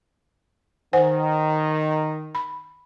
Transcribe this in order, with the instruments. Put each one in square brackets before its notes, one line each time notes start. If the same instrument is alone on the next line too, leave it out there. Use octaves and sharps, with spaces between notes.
[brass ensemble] D#3 [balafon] C5 F#5 G#5
[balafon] B5